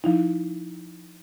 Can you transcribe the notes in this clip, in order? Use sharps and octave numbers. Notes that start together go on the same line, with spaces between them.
F3 D#4 E4